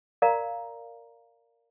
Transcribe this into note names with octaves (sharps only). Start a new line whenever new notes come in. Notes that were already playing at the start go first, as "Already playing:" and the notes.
A#4 D5 F5 A#5